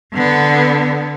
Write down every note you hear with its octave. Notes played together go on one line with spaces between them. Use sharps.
D3 B3